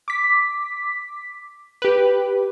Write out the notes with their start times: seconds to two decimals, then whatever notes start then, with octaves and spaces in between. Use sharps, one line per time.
0.08 D6 B6
1.82 G4 B4